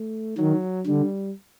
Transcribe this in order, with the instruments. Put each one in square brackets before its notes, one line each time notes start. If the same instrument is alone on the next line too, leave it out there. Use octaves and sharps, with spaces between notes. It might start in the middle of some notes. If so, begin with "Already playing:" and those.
Already playing: [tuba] A3
[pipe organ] D#3 [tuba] F#3
[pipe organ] D3 [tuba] G3